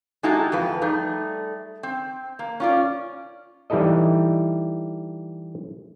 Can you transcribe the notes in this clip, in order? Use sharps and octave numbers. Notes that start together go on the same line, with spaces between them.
G#3 D#4 E4 F#4 G4 A4
F2 F3 B4
G3 A3 D#4 G#4
C4
A#3
C#4 F4 D5
E3 G3 D#4 E4 A4 D#5